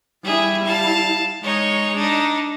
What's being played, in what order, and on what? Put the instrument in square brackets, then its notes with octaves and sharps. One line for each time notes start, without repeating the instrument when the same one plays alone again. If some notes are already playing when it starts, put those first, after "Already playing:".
[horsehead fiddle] G3 E4 [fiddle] G#4 E5
[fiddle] F5 A5
[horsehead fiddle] G#3 [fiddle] D#4 C#5
[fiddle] D4 D#4